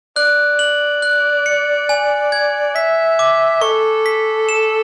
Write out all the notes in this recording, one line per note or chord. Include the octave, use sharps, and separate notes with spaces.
D5 F#6
F#7
F#6
C#7
G#5
G#6
E5 B6
D6
A4 C#6
B6
E7